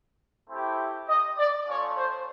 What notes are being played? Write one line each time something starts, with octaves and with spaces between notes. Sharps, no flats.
A3 C4 E4 G4
D#5
D5
A3 C#4 F4 C#5
C5